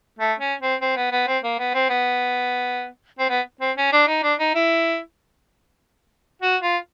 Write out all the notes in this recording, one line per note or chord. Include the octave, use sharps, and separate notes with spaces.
A3
C#4
C4
C4
B3
B3
C4
A#3
B3
C4
B3
C4
B3
C4
C#4
D4
D#4
D4
D#4
E4
F#4
F4